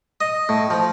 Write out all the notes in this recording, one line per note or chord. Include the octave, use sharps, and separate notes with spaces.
D#5
A2
F3